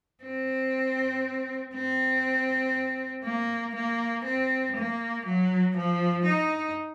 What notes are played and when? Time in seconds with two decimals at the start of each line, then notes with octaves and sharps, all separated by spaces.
0.24 C4
1.74 C4
3.24 A#3
3.75 A#3
4.25 C4
4.76 A#3
5.25 F#3
5.76 F3
6.26 D#4